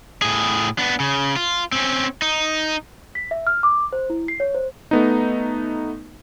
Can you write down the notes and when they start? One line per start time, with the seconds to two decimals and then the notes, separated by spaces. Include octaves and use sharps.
0.22 A2 G#4
0.78 B3 D4
1.00 C#3
1.36 F4
1.72 C4 C#4
2.22 D#4
3.15 B6
3.31 E5
3.47 F6
3.63 D6
3.93 C5
4.10 E4
4.28 C7
4.40 C#5
4.55 C5
4.91 A3 B3 D#4